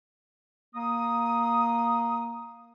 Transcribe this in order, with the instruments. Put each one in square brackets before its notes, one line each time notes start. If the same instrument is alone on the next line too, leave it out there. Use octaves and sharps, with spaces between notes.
[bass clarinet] A#3 [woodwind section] D#6